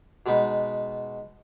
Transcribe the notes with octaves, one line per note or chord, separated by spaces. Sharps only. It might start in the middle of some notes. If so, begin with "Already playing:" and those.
B2 G#3 B3 D#4 B4